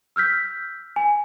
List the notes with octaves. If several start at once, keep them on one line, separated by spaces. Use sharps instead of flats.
E6 F6 G6 B6
G#5